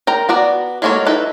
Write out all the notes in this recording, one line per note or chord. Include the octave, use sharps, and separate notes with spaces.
A#4 G5 A#5
B3 F#4 D5 A#5
F#3 G#3 A#3 A4 C#5
D#4 E4 A4 B4